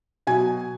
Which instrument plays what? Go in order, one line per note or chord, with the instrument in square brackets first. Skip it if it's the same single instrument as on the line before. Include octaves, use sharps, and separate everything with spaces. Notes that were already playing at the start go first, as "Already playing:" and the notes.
[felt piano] B2 F#3 G#5